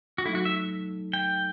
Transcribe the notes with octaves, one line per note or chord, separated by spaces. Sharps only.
F#4
F#3 A3 D#4 E4 A4
F#4
E5
G5